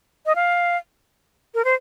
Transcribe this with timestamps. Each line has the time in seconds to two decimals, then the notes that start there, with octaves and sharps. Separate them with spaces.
0.26 D#5
0.35 F5
1.55 A#4
1.65 C5